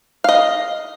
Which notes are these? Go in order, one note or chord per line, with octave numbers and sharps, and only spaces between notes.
D#5 F5